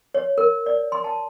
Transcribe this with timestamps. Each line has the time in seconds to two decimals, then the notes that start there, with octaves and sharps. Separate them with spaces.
0.14 C#5
0.38 A#4
0.66 D5
0.92 C6
1.04 A5